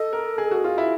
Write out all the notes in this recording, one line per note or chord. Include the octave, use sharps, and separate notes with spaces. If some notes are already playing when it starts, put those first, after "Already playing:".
Already playing: A4 D#5
A#4
G#4
F#4
F4
E4